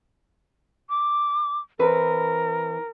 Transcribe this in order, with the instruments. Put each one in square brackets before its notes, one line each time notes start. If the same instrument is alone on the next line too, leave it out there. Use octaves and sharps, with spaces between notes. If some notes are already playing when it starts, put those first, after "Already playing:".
[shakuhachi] D6
[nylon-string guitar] E3 C4 B4 [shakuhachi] A#4